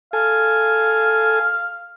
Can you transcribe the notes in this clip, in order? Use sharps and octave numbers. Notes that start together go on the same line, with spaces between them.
A4 F5 G#5